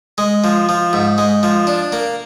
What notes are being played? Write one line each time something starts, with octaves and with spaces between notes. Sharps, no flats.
G#3
F3
F3
G#2
G#3
F3
D4
A#3